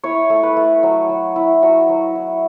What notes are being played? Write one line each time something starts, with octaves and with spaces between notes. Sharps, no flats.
E4 C#5
A3
B4
A3
F#3
F#3
E4
F#3 F#4
F#3
E4